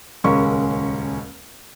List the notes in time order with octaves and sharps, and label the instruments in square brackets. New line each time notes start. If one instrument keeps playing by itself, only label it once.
[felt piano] D#1 C#2 G#3 C#4 A#4 C#6